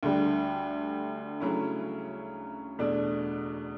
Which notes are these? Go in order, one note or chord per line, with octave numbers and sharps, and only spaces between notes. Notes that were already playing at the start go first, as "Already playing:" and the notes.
D2 D3 G3
C#3 F#3 A3 C#4 E4
E2 B2 A3 D4